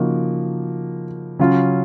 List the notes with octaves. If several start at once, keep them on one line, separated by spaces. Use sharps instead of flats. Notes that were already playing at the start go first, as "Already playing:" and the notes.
Already playing: C#3 F3 A#3 D#4 F#4
C#3 F#3 C#4 F4